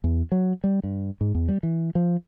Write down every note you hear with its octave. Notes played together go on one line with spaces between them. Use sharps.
E2
F#3
G3
G2
G#2
E2
G3
E3
F3